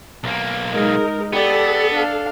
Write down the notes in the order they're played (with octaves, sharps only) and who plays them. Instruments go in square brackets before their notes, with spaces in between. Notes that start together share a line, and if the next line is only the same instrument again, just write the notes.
[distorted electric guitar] B1 A#3
[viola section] G#3 D#4 A#4
[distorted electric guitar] B3 [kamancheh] G4 D5 [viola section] A4
[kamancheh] D4 F5